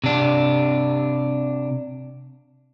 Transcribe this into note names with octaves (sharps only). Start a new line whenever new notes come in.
C3 D4